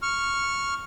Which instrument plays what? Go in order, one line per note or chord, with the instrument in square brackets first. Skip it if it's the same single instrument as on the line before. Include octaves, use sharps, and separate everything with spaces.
[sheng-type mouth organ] C#6 F6